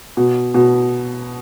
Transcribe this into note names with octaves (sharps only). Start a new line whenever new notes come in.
B2
B2